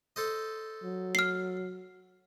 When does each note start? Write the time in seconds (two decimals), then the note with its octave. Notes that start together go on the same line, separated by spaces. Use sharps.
0.16 A4 C5 D#5
0.83 F#3
1.15 F6 C7